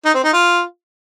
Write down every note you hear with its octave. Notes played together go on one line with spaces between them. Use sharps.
D#4
C4
D#4
F4